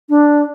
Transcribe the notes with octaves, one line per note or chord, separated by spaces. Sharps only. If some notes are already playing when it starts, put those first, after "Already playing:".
D4